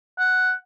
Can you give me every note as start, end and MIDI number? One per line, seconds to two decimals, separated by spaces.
0.19 0.53 78